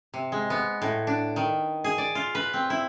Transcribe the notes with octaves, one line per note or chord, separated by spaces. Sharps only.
C3
G#3
B3
A2
D4
D#3
G#4
D5
F4
B4
C4
E4